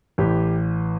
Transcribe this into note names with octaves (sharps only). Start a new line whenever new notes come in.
A1 A2 E3 G4